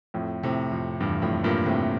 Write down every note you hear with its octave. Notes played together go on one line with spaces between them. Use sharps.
F2 A2
A2 C3
F2
E2 G2
F2 A2
G2 A#2
A2 C3